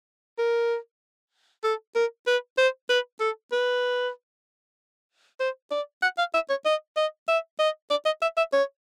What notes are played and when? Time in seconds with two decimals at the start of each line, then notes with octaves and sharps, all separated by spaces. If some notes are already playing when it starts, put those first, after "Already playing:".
0.39 A#4
1.64 A4
1.96 A#4
2.27 B4
2.58 C5
2.89 B4
3.20 A4
3.52 B4
5.40 C5
5.71 D5
6.03 F#5
6.18 F5
6.34 E5
6.50 C#5
6.65 D#5
6.97 D#5
7.28 E5
7.59 D#5
7.90 D5
8.06 D#5
8.22 E5
8.37 E5
8.53 C#5